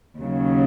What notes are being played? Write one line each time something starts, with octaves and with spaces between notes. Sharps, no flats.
D#2 C#3 F#3